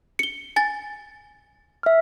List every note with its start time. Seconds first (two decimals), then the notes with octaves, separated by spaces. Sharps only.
0.19 C#7 G7
0.56 G#5 A6
1.83 E5 F6